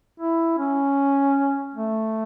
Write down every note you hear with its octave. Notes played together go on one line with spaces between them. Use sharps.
E4
C#4
A3